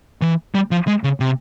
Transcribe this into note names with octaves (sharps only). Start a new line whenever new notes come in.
E3
G3
F3
G#3
C#3
C3